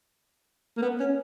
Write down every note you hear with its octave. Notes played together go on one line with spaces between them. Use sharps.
A#3
B3
C#4